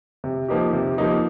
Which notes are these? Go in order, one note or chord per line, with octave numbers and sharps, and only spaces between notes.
C3
F3 A#3 D#4 G4
C3
F3 A#3 D#4 G4